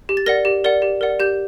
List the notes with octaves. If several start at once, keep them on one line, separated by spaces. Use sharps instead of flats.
G4
A6
A#4 D5 F#5 A#6
G4
A#4 D5 F#5
G4
A#4 D5 F#5
G4 G6